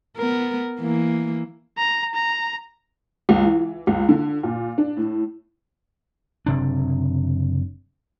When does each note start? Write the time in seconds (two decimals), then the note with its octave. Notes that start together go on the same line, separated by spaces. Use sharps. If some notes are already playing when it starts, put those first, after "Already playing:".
0.18 B3 A#4
0.80 E3 A#3
1.78 A#5
2.15 A#5
3.29 C#2
3.44 E3
3.87 C#2
4.09 D3
4.43 A#2
4.78 D4
4.97 A2
6.46 F#1 C3 D4